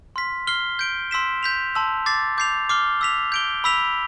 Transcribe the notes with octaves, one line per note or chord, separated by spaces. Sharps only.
C6 F6 B6
F6 C7 G7
G6 D7 G7
C6 E6 B6 E7
G6 B6 F7
A5 C6 E6 B6
D6 A6 C7
D6 G6 C7 F7
D6 F6 C7 G7
E6 B6 F7
G6 D7 G7
B5 E6 B6 F7